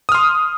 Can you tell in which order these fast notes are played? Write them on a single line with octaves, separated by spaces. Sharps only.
D#6 F6 C6